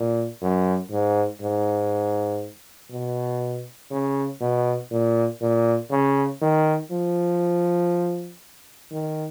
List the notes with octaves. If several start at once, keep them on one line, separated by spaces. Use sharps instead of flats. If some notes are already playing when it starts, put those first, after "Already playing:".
Already playing: A#2
F#2
G#2
G#2
B2
C#3
B2
A#2
A#2
C#3
D#3
F3
D#3